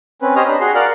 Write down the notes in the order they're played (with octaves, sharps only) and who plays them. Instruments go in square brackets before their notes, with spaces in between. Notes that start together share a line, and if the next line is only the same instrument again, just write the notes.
[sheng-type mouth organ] C4 C#4 B4
G4 C5 C#5 D#5 D#6 F6
D4 A#5 B5
F#4 G#4 C6
A#4 D5 F5 F#5 F6 F#6